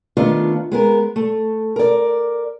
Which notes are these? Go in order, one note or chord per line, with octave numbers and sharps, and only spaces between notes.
D#3 A3 B3 D4 F4
G#3 B3 A#4
A3
A#4 D5